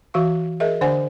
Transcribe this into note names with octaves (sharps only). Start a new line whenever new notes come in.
E3 F#4 E5 F5 C#6
G#4 A#4 D#5 E5
D3 D4 C5 D5 F#5 G#5